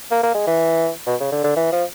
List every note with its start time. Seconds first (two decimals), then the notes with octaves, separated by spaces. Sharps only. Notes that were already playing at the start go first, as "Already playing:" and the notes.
0.11 A#3
0.23 A#3
0.34 G#3
0.47 E3
1.07 B2
1.20 C#3
1.32 D3
1.44 D3
1.56 E3
1.72 F3